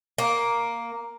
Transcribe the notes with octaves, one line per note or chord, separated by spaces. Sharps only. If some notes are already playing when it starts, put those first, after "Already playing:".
A#3